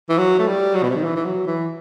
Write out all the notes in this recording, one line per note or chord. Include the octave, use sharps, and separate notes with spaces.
E3
F#3
A3
G3
F#3
B2
C3
D#3
E3
E3
F#3
E3